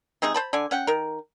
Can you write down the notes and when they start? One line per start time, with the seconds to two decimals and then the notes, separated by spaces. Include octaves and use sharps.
0.22 C3 G#3 D#4 G#4
0.34 C5 A5 B5
0.53 D3 D5 G#5
0.71 C#4 F#5 G5
0.87 D#3 A#4